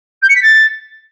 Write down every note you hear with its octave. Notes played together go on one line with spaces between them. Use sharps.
G6
C#7
B6
A6